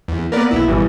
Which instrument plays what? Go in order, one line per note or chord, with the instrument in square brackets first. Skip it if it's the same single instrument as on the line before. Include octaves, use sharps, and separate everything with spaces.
[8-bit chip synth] E2
[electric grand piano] A#3 B3 [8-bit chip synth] A#4 B4 D5
[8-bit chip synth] B1 E4
[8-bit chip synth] G#1 [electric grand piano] B2 E3 G3